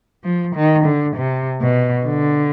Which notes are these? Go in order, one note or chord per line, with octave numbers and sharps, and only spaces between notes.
F3
D#3
D3
C3
B2
D3